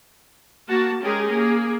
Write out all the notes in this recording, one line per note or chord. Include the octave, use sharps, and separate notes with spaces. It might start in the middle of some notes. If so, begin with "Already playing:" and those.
A#3 F#4 A5
G#3 C#4 G4 G#4 A#4
A#3 G#4